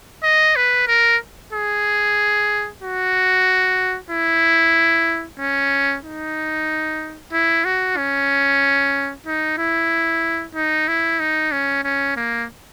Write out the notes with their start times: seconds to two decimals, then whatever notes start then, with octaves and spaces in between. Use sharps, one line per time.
0.24 D#5
0.56 B4
0.88 A#4
1.53 G#4
2.82 F#4
4.11 E4
5.39 C#4
6.04 D#4
7.33 E4
7.65 F#4
7.97 C#4
9.26 D#4
9.58 E4
10.55 D#4
10.88 E4
11.20 D#4
11.52 C#4
11.84 C#4
12.16 A#3